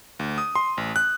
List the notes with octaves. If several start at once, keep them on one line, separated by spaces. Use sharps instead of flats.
D2
D#6
C6
A1
F#6